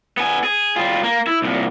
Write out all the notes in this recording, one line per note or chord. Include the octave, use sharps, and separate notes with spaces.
B3 G#5
G#4
G3 F4
A#3
E4
C2 A#2